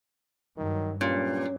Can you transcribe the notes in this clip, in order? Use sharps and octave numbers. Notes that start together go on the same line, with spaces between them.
G2 D#3 F#3
G2 A#2 F#3 C#4